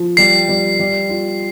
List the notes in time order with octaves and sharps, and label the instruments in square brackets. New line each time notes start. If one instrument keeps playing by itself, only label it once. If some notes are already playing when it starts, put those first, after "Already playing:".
Already playing: [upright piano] F3
[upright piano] G3 [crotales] C7
[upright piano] G3
G3
F4